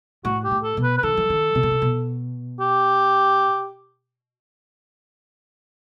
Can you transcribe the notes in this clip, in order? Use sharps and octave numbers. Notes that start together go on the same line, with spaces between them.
A2 F#4
G4
A2
A4
B2
B4
B4
D#3 A4
E3
D#3
C3
B2
C3
B2
G4